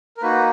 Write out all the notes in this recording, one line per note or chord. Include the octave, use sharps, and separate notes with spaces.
A#4
A#3 D#4 F#4 B4